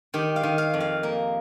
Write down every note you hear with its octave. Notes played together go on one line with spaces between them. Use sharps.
D#3 G4
F5
D#3
F5
F2
F5
A#3